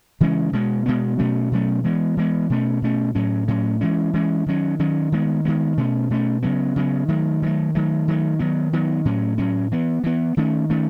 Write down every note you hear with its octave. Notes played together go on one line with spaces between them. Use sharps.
C#3 E3 G#3 C#4
B2 G#3 B3
B2 G#3 B3
B2 F#3 A3 C#4
B2 F#3 A3 C#4
E3 G#3 B3
E3 G#3 B3
B2 A3 C#4
B2 A3 C#4
A2 F#3 C#4
A2 F#3 C#4
E3 G#3 C#4
E3 G#3 C#4
D#3 F#3 C#4
D#3 F#3 C#4
D#3 G#3 B3
D#3 G#3 B3
B2 A3 C#4
B2 A3 C#4
C#3 F#3 B3
C#3 F#3 B3
D#3 F#3 A3
D#3 F#3 A3
D#3 F#3 A3
D#3 F#3 A3
D#3 F#3 B3
D#3 F#3 B3
A2 F#3 C#4
A2 F#3 C#4
E3 B3
E3 B3
D#3 A3 C#4
D#3 A3 C#4